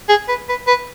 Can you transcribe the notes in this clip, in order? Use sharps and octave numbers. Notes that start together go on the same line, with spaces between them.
G#4
B4
B4
B4